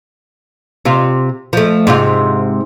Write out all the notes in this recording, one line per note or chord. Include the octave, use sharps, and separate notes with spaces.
C3 F4
F3 A3
G#2 C3 F4